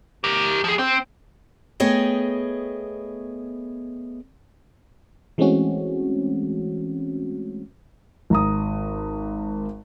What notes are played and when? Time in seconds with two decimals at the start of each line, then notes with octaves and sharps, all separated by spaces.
0.24 G4 A#4
0.64 F3 G#4
0.79 C4
1.80 A3 B3 G#4 C#5 D#5 G5
5.38 E3 G#3 A3 C4 C#4 F#4
8.30 G#1 A#5 D#6